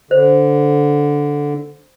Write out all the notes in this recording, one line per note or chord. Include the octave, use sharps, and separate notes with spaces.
D3 C5